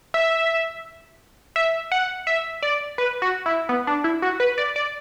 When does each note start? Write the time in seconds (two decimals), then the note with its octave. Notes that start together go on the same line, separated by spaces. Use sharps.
0.14 E5
1.56 E5
1.92 F#5
2.27 E5
2.62 D5
2.98 B4
3.22 F#4
3.46 E4
3.69 B3
3.87 D4
4.04 E4
4.22 F#4
4.40 B4
4.58 D5
4.76 D5